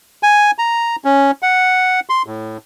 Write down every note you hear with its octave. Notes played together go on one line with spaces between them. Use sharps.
G#5
A#5
C#4
F#5
C6
A2